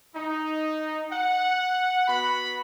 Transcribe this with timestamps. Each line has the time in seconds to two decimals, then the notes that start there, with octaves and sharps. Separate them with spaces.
0.15 D#4
1.12 F#5
2.08 B3 F#4 B5